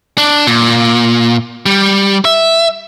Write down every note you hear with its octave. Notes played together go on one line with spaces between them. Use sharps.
D4
A#2
G3
E5